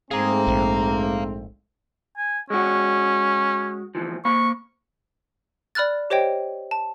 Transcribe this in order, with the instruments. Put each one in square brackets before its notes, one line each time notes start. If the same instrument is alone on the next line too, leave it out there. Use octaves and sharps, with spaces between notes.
[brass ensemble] G#2 A3 C4 [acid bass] G#4 [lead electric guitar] F5 A#5
[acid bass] A#1
[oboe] G#5
[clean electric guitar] G#3 F#4 [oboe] C#4
[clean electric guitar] D2 E3 F3
[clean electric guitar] A#3 F5 B5 [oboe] C#6
[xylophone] D5 B5 F6 F#6 A6
G4 C5 C#5 D#5 G5
A5